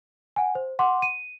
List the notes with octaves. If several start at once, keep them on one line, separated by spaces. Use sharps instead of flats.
F#5 G#5
C5
F#5 C6 D6
D#7